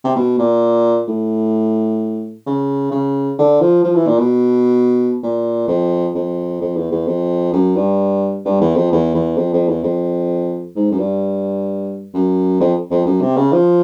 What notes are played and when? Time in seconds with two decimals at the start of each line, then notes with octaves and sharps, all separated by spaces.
0.05 C3
0.16 B2
0.38 A#2
1.08 A2
2.47 C#3
2.91 C#3
3.39 D3
3.61 F3
3.84 F3
3.96 E3
4.07 A#2
4.19 B2
5.23 A#2
5.68 F2
6.15 F2
6.61 F2
6.76 E2
6.92 E2
7.07 F2
7.53 F#2
7.76 G2
8.45 G2
8.61 E2
8.76 F2
8.92 E2
9.14 E2
9.37 F2
9.53 F2
9.68 E2
9.83 F2
10.76 G#2
10.92 F#2
10.99 G2
12.14 F#2
12.60 F2
12.91 F2
13.06 F#2
13.21 C3
13.37 C#3
13.52 F3